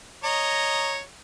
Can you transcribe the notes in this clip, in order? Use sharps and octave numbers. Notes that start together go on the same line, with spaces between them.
C#5 D#5 A#5